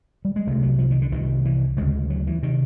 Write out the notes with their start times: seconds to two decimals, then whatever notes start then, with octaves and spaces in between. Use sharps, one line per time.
0.25 G3
0.36 G#3
0.47 C2 C3 A3
0.63 F#3
0.79 F3
0.91 D#3
1.02 D3
1.12 C2 C3 D#3
1.45 E3
1.77 D2 C#3 G#3
2.10 F#3
2.27 E3
2.43 C3 D#3